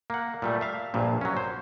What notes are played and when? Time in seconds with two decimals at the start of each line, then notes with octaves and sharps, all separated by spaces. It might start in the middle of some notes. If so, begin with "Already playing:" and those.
0.10 A#3 F#5
0.42 A#2 G3 A3
0.61 E5 F5
0.94 A#1 G2 A#2
1.21 F#3 C#4
1.37 C5